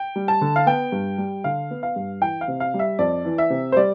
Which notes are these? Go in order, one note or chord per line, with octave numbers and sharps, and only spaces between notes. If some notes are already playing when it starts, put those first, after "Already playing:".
Already playing: G5
G3
A5
D3
F5
B3 G5
G2
G3
D3 F5
B3
F5
G2
E3 G5
F5
C3
F5
G3
E5
F2 D5
E3
E5
C3
C5
G3 D5